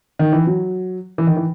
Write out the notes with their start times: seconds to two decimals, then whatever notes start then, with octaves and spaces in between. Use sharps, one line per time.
0.19 D#3
0.33 E3
0.47 F#3
1.18 E3
1.27 D#3
1.37 E3